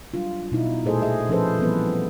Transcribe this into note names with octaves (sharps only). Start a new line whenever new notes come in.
F#3 G3 D4 F4
B2 D#4 E4
A#2 A3 G#4 A4 C5 D#5
G#4 D#5 E5
F3 C#4 G#4 A4 B4 C5
E3 F3 G3 B3 C4 B4